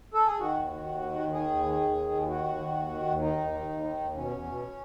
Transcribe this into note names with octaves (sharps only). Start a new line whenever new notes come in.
A4
G#4
D#3 F#4
D#2
D#3
D#2
D#3
D#2
D#3 G#4
D#2
D#3
D#2
D#3
D#2
D#3 F#4
D#2
D#3
D#2
D#3
D#2
D#3 D#4
D#2
D#3
D#2
D#3
D#2
B2 C#4
E2
B2